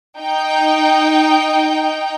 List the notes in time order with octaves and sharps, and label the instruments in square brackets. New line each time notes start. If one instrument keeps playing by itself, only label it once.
[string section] D#4 G5